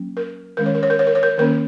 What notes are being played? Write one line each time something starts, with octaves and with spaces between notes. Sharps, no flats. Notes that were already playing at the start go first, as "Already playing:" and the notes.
Already playing: F#3 A#3 C#4
A#4
D#3 G#3 C#4 A#4
C#5
A#4
C#5
A#4
C#5
A#4
C#5
A#4
D#3 A#3 C#4 A#4